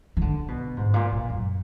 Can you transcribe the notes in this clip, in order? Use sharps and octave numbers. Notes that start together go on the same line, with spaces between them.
D#3
D3
B2
G#2
A#2
A#2
F#2